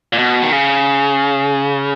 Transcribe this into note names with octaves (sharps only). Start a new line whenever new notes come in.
A#2
B2
D#3
C#3